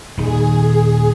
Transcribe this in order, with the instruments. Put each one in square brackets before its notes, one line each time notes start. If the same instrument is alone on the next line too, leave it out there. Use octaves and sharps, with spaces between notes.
[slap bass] D#1 D#3 [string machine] G#4